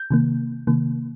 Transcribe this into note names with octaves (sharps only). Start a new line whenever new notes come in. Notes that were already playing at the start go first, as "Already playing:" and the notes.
Already playing: G6
C3 D#3 A#3
C3 D#3 A#3